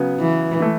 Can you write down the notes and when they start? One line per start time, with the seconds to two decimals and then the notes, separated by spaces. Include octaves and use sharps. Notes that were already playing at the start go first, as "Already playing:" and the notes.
Already playing: C#3 F#3 B3
0.20 E3
0.60 E3 A3